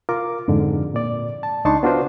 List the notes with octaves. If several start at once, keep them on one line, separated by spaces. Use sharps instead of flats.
F4 A#4 D6
F2 G#2 D3
A#2 D5
A5
C#2 D4 D#4 A5 C6 C#6
B3 D4 F4 F#4 B4 C5